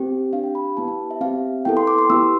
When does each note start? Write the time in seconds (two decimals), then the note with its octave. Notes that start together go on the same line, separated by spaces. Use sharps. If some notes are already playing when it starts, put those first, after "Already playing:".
Already playing: C4 G4
0.33 D4 G4 F5
0.44 G5
0.55 B5
0.77 B3 E4 G4 A5
0.88 A5
1.11 E5
1.21 C4 G4 F5
1.65 B3 E4 A4 G5
1.77 C6
1.87 D6
1.98 C6
2.10 B3 E4 G4 E6